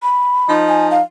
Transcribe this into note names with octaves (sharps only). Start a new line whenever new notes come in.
B5
F3 D#4
G#5
F5